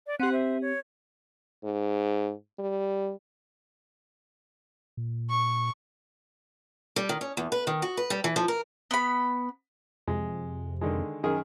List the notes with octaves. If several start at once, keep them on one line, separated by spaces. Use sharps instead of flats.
D5
C4 G4 F#5 C6 F#6
C5 E5
C#5
G#2
G3
A#2
C#6
G3
D#3
C#4
E2
B4
D#3
F#4
B4
G3
E3
F3
A#4
B3 B5
F2 C3 G#3
D3 D#3 G#3
F#2 D#3 G#4